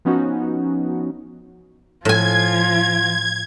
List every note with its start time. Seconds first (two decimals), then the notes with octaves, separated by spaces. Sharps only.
0.05 F3 B3 C#4 D#4 F#4
2.05 A2 F3 F4 G#5 G#6